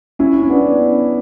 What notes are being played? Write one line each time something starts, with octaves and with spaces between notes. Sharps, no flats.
C#4 E4
C#4
B3 D4